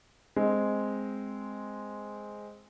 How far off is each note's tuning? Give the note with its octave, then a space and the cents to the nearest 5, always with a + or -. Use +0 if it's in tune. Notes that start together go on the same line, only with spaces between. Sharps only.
G#3 +0 C4 +0